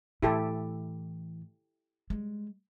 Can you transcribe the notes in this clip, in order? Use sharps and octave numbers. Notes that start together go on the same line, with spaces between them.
A2 E3 E4 G4 A4
G3 G#3